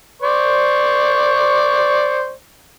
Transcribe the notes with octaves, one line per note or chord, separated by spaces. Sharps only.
C5 D5 C#6